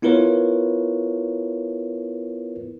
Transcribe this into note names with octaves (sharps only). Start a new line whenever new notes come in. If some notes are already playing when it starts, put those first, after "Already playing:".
B3 E4 F4 A#4 B4 C#5